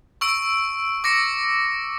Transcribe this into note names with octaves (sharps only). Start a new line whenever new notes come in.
C#6 E6 D7
D6 A#6 C#7